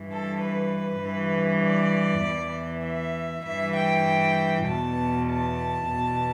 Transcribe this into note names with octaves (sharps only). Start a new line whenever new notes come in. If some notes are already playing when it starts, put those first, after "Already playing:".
Already playing: G2 E3
A4
B4
G2 E3
D5
E2 E3
E5
G2 E3 E5
G5
E2 B2 A5
A5
E2 B2